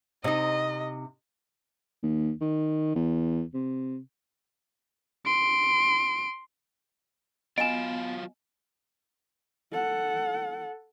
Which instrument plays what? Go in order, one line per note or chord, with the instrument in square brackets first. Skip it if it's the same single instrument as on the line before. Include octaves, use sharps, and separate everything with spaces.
[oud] C3 D#4 [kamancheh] D#5
[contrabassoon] D#2
D#3
E2
C3
[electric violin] C6 D7
[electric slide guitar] F#3 F4 F5 [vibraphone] B3 [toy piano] D#5 G#5 [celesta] D7 E7
[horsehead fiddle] A4 F#5